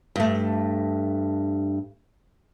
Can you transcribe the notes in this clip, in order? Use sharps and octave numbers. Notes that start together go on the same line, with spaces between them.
G2 A3